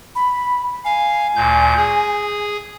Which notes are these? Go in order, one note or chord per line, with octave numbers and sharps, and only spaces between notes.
B5
F5 G#5
D2 A#2 G6
G#4